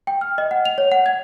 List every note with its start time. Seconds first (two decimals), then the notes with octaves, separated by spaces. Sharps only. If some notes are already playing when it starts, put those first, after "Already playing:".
0.07 G5
0.21 F6
0.38 D#5
0.51 F#5
0.65 F7
0.78 C#5
0.92 F#5
1.06 G#6